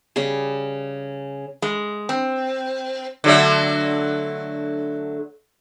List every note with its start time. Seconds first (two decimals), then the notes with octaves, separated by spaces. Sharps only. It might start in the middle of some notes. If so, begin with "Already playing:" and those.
0.16 C#3 G3 G#4
1.62 G#3
2.09 C4
3.24 D3 F#3 A3